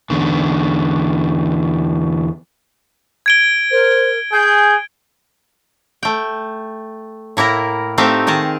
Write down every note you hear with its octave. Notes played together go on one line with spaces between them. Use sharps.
E2 D3
G#6 D7 G7
A#4 C5
G#4 G#5 G6
A3 G5
A2 A#3 E4 A#4
A3 C4 D#4 G4 E5 F5
D#3 G#4 A#4 A5